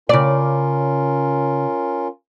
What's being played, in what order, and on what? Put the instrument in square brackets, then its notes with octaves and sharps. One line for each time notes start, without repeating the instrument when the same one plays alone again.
[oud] C#3 D5 [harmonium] C#4 F4 A#4